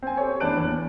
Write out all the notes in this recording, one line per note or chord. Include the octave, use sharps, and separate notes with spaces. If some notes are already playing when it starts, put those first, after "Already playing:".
C4 G#5
G4 A4 C5 C#5
A1 B3 D4 A5 F#6 D7
E2